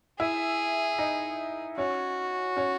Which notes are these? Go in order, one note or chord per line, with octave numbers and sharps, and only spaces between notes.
E4 G#4 E5
D#4 D#5
C#4 F#4 C#5
C#4 C#5